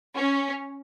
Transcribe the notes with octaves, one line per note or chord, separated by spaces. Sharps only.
C#4